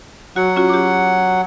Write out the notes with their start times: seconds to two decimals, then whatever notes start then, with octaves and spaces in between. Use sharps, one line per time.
0.36 F#3 F#4 F#5
0.56 C#4 F4 F#4
0.69 G4 D6